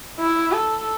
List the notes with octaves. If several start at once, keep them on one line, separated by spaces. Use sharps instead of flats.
E4
A4